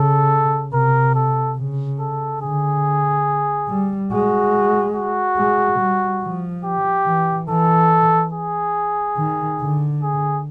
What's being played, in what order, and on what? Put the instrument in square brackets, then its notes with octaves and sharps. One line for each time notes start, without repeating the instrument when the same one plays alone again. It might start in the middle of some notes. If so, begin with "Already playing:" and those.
Already playing: [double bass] C#3 [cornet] A4
[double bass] C3 [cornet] A#4
[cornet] A4
[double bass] C#3
[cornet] A4
[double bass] D3 [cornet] G#4
[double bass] G3
[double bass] G#3 [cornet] F#4
[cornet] F#4
[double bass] G#3
G3
F3
[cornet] G4
[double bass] E3
[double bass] E3 [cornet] A4
[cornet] G#4
[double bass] D#3
D3
[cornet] G#4